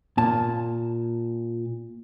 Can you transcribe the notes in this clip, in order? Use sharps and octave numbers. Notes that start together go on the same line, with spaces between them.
A#2 A5